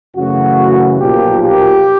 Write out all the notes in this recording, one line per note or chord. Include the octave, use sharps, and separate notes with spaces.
F#2 C#3 E3 A3 F#4
B1 A#2 F3 A#3 G4
G4